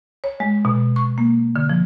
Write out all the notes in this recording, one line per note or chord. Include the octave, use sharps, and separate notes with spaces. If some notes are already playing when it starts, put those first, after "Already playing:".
C#5
G#3
B2
C#6
A#3
D3
F3